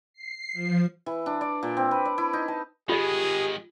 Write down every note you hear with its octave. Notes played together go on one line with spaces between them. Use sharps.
C7
F3
E3
D4
D5
A#2
C4
B4
D5
E4
D#4
A5
D#3 G#3 F4 G4 G#4 D#5